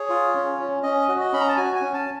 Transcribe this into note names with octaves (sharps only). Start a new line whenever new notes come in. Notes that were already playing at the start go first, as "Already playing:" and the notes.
Already playing: G#4 C#5
F4
C#4
C#4
C#4 D#5
F#4
D#5
C#4 B5
A#5
A5
F#4 G#5
G#5
C#4
A5